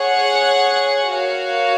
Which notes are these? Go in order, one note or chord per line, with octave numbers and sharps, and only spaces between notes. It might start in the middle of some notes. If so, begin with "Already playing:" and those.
Already playing: G#4 C#5 F#5
F#4 A#4 C#5 F5